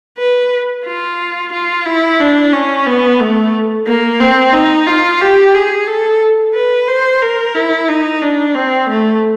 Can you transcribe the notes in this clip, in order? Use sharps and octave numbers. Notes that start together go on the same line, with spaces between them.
B4
F4
F4
E4
D4
C#4
B3
A3
A#3
C4
D#4
F4
G4
G#4
A4
B4
C5
A#4
E4
D#4
D4
C4
A3